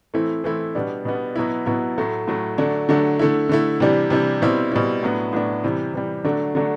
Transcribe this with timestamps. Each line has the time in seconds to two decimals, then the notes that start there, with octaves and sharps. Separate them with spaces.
0.14 E3 A3 C4 E4
0.44 E3 A3 C4 E4
0.75 B2 G3 B3 D4
1.05 B2 G3 B3 D4
1.35 B2 F#3 B3 E4
1.66 B2 F#3 B3 E4
1.98 A2 F#3 A3
2.27 A2 F#3 A3
2.58 D3 F#3 A3 D4
2.89 D3 F#3 A3 D4
3.19 D3 A3 E4
3.49 D3 A3 E4
3.80 C3 E3 G3 D4
4.10 C3 E3 G3 D4
4.42 B2 G3 C4 E4
4.71 B2 G3 C4 E4
5.03 A2 F#3 B3 D4
5.33 A2 F#3 B3 D4
5.64 C3 E3 G3
5.93 C3 E3 G3
6.24 D3 F#3 A3 D4
6.55 D3 F#3 A3 D4